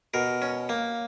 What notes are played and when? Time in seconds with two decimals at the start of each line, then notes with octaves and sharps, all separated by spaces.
0.14 B2 A#4
0.42 C#4
0.69 A#3